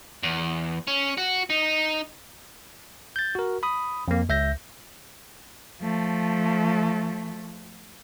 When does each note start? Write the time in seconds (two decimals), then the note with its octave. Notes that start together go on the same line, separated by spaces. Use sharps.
0.23 E2
0.87 C#4
1.18 F#4
1.50 D#4
3.16 G6 A6
3.35 F#4 A#4
3.63 B5 D#6
4.08 F2 A#3
4.29 C#2 E5 G6 A#6
5.81 F3 A3